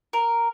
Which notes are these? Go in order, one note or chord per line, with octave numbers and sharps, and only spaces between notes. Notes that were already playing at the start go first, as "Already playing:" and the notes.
A#4